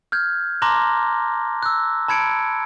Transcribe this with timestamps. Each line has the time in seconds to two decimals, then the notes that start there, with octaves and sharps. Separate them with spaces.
0.12 F6 G6 G#6
0.62 A5 A#5 C6 D6 F#6 A#6
1.63 E6 F#6
2.08 A5 B5 G#6 C#7 D7